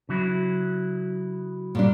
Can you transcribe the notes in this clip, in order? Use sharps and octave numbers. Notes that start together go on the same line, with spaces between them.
C#3 F#3 E4
A#2 G3 D4